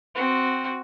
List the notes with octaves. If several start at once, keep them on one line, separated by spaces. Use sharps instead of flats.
C4 F#4